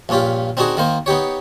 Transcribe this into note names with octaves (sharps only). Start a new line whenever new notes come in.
A#1 G2 C#4 F4 G4
C4 D4 D#4 F#4 G#4
D#3 A#3 C5
B3 D#4 G4 C#5